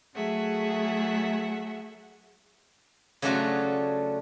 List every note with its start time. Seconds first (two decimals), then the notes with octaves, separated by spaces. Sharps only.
0.14 F#3 A3 G#4 E5 F#5
3.22 C#3 F#3 A3 D4 F4 F#4